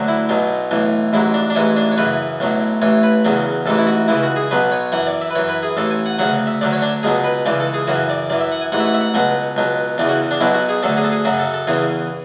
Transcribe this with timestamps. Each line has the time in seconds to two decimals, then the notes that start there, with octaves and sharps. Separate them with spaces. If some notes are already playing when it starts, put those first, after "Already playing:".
Already playing: D2 D3 F#3
0.08 E4
0.29 B1 B2 F#3
0.71 B1 A2 E3
1.13 A1 G#2 F#3 E4
1.34 D4
1.50 D4
1.55 A1 G#2 E3 C#4
1.77 D4
1.92 C#5
1.98 F#2 C#3 E3 B4
2.40 B1 A2 F#3
2.82 A1 A2 E3 C#5
3.03 B4
3.25 E2 C#3 F#3
3.66 A1 G#2 E3 A4
3.78 E4
3.87 F#4
4.08 C#2 C#3 E3 E4
4.23 F#4
4.36 G#4
4.51 B1 B2 F#3 B4
4.71 C#5
4.92 F#2 E3 F#5
5.07 D5
5.21 E5
5.31 B4
5.35 F#2 E3 C#5
5.49 B4
5.63 G#4
5.77 A1 A2 E3 A4
5.91 G#5
6.06 F#5
6.19 D2 C#3 F#3 F#5
6.47 E5
6.61 D2 D3 F#3 D5
6.73 C#5
6.82 D4
7.03 C#2 B2 F#3 G#4
7.24 B4
7.46 C#2 C#3 E3 D5
7.60 A4
7.74 G#4
7.87 F#2 C#3 E3 F#4
8.10 D5
8.30 F#2 E3 D5
8.41 E5
8.52 F#5
8.61 G#5
8.72 A1 G#2 E3 F#5
8.80 E5
8.86 F#5
8.94 E5
9.01 F#5
9.14 C#2 B2 F#3 F#5
9.57 C#2 B2 F#3
9.98 E2 C#3 E3 D5
10.09 F#4
10.31 D4
10.41 B1 B2 F#3 E4
10.54 F#4
10.69 G#4
10.83 D2 D3 F#3 A4
10.97 G#4
11.04 A4
11.12 G#4
11.25 F#2 C#3 F#3 F#4
11.39 A4
11.54 A4
11.67 E2 C#3 E3 G#4